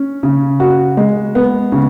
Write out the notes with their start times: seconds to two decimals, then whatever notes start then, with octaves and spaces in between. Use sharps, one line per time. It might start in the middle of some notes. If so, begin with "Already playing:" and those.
Already playing: C#4
0.23 C#3
0.60 F#4
0.97 G#3
1.35 B3
1.72 C#3